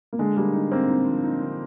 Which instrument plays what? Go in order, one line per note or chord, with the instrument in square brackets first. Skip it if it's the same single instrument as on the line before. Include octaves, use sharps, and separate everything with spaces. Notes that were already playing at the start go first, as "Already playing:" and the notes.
[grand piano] A#3
[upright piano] D3 [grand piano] G#3
[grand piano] G3 [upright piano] A#3
[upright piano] D#4
[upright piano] A#3 [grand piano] C4
[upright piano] D#4
F3
D#4
D3